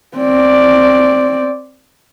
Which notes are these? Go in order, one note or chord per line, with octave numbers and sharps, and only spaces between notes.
C4 D5